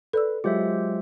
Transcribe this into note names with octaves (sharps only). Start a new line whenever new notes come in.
A4 B4 D5 E6
F#3 G#3 F4 G4 C5 E5